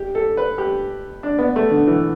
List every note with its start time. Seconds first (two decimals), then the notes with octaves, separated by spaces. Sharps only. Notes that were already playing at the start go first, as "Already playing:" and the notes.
Already playing: G4
0.15 A4
0.37 B4
0.58 G4
1.23 D4
1.39 B3
1.56 A3
1.71 D3
1.87 E3